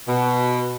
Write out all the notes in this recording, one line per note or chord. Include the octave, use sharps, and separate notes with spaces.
B2